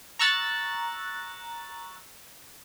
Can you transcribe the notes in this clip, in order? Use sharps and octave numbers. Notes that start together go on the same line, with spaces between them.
A#5 C#6 E6 F#6 A6